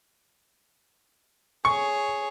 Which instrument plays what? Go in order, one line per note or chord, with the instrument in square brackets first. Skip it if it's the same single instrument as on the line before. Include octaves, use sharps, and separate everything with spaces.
[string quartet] G#4 C#5 [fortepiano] C#6